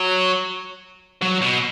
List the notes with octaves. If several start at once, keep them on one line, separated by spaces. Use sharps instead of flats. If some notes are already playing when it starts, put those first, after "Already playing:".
Already playing: F#3
F#3
B2